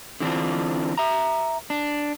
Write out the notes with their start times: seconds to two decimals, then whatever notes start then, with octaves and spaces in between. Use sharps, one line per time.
0.20 D3 E3 C4 D4 F4
0.98 E5 A#5
1.70 D4